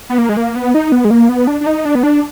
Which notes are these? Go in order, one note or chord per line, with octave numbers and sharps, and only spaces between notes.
B3
A#3
G#3
A#3
B3
D#4
B3
G#3
A#3
B3
D4
D4
D#4
D4
B3
D4